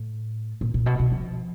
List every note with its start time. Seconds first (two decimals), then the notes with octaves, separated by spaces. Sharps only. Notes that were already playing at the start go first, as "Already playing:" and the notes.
Already playing: A2
0.61 A#2
0.74 A#2
0.86 B2
0.99 B2
1.12 F3